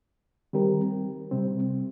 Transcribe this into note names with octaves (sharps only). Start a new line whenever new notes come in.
D#3 G3 C4 G4 A#4
C3 G3 C4